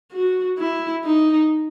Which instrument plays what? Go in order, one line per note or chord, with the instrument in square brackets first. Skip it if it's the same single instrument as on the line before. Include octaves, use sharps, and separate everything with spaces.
[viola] F#4
E4
D#4